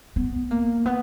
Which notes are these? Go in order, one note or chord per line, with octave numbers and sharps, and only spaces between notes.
B3
A#3
B3